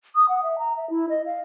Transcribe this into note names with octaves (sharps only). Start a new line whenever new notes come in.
D#6
F#5
E5
A#5
E5
E4
D#5
F5